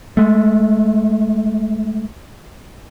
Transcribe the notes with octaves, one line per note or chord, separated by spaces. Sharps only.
G#3 A3